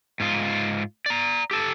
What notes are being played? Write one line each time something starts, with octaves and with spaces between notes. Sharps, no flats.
G#2 F4
D5 A#5
G4 A4